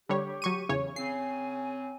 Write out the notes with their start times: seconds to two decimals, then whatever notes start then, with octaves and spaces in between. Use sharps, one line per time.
0.09 D3 G3 G4 C#5
0.42 F#3 C#6 D#7
0.69 E2 C#3 C#5
0.96 C#3 C4 G#5 C7